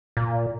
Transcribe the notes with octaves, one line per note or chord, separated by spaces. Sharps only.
A#2